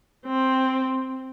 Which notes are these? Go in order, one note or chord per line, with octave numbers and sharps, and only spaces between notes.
C4